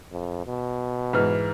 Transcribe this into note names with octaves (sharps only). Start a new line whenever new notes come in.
F2
B2
G#2 E3 F6